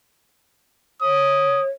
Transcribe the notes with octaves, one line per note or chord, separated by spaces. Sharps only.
C#5 D#6